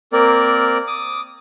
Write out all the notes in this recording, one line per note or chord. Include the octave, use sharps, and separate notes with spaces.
A#3 C4 A#4 D5
D6 D#6